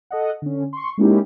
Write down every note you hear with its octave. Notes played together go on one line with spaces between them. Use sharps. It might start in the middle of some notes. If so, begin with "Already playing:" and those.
A4 D#5 F#5
D3 C#4
C6 C#6
G#3 A#3 C#4 D#4 E4 G4